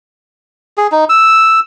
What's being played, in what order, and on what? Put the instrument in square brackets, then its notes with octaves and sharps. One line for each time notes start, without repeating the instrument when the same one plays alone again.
[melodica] G#4
D#4
E6